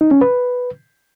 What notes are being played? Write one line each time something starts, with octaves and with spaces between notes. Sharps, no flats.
D#4
C#4
B4